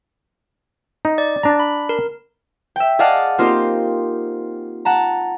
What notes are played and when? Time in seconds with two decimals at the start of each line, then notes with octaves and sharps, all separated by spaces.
1.05 D#4
1.18 D5
1.43 D4 A#5
1.59 B5
1.89 A#4
2.76 E5 G5
2.99 G#4 D5 D#5 F5 F#5 A5
3.38 A#3 C4 D#4 F4 G4
4.85 F#5 A5 A#5